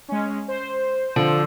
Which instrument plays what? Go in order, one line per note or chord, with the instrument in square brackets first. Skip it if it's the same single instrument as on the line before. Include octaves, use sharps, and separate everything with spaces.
[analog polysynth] G#3 C#4
C5
[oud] D3 [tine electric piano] F3